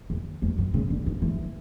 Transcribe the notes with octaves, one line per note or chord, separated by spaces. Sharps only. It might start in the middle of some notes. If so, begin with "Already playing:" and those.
E2
E2
F#2
C#3
D3
E3
E3